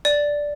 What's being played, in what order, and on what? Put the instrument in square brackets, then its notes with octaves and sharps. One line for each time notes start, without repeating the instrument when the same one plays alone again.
[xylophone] D5